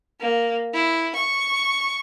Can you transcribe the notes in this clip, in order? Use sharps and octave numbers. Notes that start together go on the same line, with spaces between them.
A#3
E4
C#6